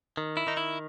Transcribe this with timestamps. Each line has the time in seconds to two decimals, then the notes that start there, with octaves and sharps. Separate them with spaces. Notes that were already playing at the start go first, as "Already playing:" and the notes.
0.17 D#3
0.37 E4
0.47 D#3 D#4
0.57 E4